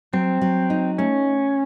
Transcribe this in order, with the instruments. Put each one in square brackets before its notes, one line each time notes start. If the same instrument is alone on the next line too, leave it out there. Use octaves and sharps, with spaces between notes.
[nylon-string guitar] F#3 [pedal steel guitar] C4
[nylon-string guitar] F#3
D#4
[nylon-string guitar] A3 [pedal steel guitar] C#4